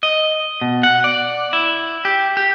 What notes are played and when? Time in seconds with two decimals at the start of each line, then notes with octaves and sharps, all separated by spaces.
0.03 D#5
0.61 B2
0.83 F#5
1.04 D5
1.53 E4
2.05 G4
2.37 G4